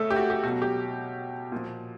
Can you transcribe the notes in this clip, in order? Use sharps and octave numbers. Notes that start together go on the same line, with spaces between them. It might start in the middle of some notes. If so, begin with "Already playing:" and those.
Already playing: C#3 A3 A4
G4
F#4
G4
B2 F#3 F#4
G4
A#2 F3